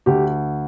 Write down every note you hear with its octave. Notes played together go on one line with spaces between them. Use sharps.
D2 G4